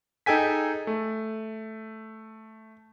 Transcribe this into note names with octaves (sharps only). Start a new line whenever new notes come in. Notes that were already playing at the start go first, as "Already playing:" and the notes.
D#4 G#4 A4 G5 G#5 B6
A3